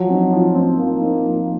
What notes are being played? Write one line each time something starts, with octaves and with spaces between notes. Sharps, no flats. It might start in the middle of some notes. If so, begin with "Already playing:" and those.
Already playing: F3 F#3
C4 D#4
F3
C4 D#4
F3 A#3
C4 D#4
F3